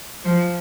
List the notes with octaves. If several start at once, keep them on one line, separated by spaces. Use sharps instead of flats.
F3